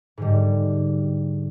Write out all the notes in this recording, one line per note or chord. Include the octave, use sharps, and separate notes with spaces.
G#2 D3 G3